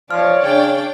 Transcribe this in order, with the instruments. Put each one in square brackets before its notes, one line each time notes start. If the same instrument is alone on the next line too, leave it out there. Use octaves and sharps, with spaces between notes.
[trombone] F3 [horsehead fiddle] C#5 D5 [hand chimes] F6
[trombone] C#3 [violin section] D4 G5